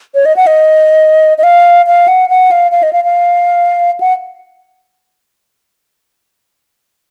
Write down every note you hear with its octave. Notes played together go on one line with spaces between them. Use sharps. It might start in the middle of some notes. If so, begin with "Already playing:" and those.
C#5
D#5
F#5
D#5
D#5
F5
F5
F#5
F#5
F5
F5
D#5
F5
F5
F#5